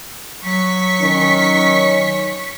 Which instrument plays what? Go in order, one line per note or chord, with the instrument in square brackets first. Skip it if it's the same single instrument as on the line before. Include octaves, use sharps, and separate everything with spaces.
[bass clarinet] F#3 [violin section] C#6 B6
[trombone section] D#3 C#4